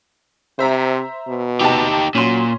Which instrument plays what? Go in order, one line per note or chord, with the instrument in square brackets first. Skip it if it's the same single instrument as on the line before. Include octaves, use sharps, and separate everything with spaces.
[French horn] C3 [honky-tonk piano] C5 E5 A#5
[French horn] B2
[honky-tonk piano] C3 A5 [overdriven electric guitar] D#4 G4
[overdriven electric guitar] A#2 [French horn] F#3 [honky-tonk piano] C#4 C6